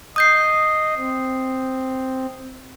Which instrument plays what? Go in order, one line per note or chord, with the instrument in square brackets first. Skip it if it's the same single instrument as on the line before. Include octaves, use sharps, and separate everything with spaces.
[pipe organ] D#5 [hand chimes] D#6 G6 C7
[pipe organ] C4